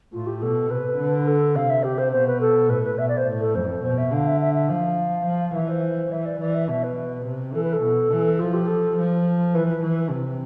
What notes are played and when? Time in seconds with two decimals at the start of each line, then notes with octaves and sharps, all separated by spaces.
0.13 A2 F4
0.27 G4
0.42 B2 A4
0.69 C3 B4
0.99 D3
1.27 A4
1.55 C3 F5
1.70 E5
1.83 G4
1.98 C5
2.12 B2 C5
2.27 B4
2.41 A4
2.69 A2 B4
2.83 B4
2.98 B2 E5
3.08 D5
3.17 C5
3.26 A2
3.40 A4
3.55 F2 C5
3.83 B2 C5
3.98 E5
4.12 D3 F5
4.27 E5
4.41 E5
4.54 E5
4.69 F3 F5
5.26 F3
5.55 E3 E5
5.69 C5
6.12 E3 E5
6.25 D5
6.40 E3 D5
6.54 E5
6.68 B2 E5
6.83 B4
7.26 C3
7.54 E3 A4
7.64 B4
7.73 A4
7.82 B2
8.11 E3
8.39 F3 F4
8.54 G4
8.68 A4
8.97 F3
9.54 E3 B4
9.67 B4
9.82 E3
10.10 C3